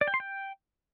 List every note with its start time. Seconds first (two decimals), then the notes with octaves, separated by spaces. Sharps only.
0.01 D5
0.08 G5
0.14 C6
0.20 G5